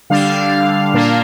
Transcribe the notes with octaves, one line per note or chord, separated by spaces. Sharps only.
D3 G3 D4 F5
A#2 A#3 D4